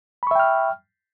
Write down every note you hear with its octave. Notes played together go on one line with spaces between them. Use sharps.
E5 G5 B5 C#6 F6